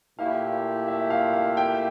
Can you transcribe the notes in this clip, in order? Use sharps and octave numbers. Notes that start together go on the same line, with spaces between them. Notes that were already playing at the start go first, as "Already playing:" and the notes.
A#2 A3 E4 G4 F5
E5
F5
F5
G5